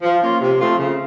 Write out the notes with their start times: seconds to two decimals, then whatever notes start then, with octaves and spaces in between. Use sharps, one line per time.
0.02 F3
0.21 A#3 C#4 F4
0.41 C3
0.60 F3 A3 C4 F4
0.79 C#3